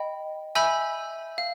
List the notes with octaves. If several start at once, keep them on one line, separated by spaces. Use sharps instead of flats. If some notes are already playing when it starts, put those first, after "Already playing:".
Already playing: D#5 G5 B5
E5 G#5 B5 E6 G6
F5